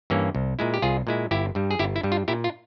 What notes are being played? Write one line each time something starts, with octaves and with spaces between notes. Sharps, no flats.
G2 E3 A#3 C#4
C2
A#2 G#3 E4
G4
C2 F4 G#4
A#2 G#3 E4
G1 E4 G4
G2 G3
G#4
G1 E4 G4
E4
G2 G3
F4
A#2 E4 G4
F4